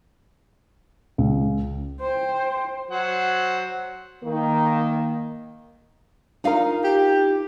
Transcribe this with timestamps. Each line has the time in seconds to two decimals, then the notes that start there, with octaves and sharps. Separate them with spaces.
1.18 C#2
2.01 C5 G5
2.91 F#3 C5 F#5
4.24 D#3 A#3
6.44 D4 D#4 F4 A#4 F5
6.84 G4